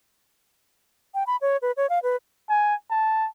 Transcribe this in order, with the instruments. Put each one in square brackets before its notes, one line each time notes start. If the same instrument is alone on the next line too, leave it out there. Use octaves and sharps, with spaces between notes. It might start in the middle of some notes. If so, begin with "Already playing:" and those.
[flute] G5
B5
C#5
B4
C#5
F5
B4
[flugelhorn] G#5
A5